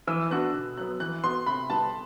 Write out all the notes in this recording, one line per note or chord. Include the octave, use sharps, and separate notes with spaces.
E3 E6
B3 D4 F#4 F#6
B2
F#3 B3 F#6
E3 F#6
B3 F#4 C6
C3 B5
G3 B3 A5